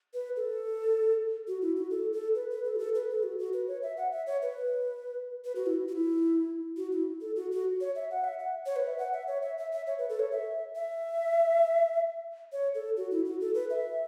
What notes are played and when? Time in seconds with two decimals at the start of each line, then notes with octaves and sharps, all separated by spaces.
0.14 B4
0.36 A4
1.48 F#4
1.62 E4
1.76 F#4
1.91 A4
2.13 A4
2.35 B4
2.51 B4
2.65 A4
2.76 F#4
2.79 A4
2.95 B4
3.10 A4
3.23 F#4
3.39 F#4
3.53 B4
3.68 C#5
3.82 E5
3.97 F#5
4.12 E5
4.27 C#5
4.42 B4
5.45 B4
5.56 F#4
5.66 E4
5.88 F#4
5.93 E4
6.77 F#4
6.92 E4
7.21 A4
7.36 F#4
7.52 F#4
7.81 C#5
7.95 E5
8.11 F#5
8.24 E5
8.39 F#5
8.66 C#5
8.76 B4
8.87 E5
8.98 F#5
9.13 E5
9.28 C#5
9.42 E5
9.58 E5
9.72 E5
9.87 C#5
9.98 B4
10.09 A4
10.20 C#5
10.32 E5
10.76 E5
12.52 C#5
12.75 A4
12.97 F#4
13.11 E4
13.25 F#4
13.41 A4
13.55 B4
13.70 E5